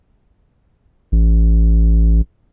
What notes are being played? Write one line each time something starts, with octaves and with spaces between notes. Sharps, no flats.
A1